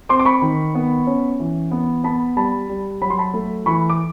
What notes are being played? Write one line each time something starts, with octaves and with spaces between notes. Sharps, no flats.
C4 C6 D6
D6
B5 C#6
D#3
B3
C#4
E3
B3
B3 A5 B5
G3 A5 B5
G3
F#3 B5
C6
A5 B5
A3
E3 B5 C#6
D6